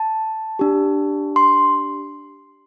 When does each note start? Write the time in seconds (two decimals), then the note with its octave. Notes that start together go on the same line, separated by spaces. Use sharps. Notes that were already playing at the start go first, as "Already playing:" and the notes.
Already playing: A5
0.59 D4 G4
1.36 C6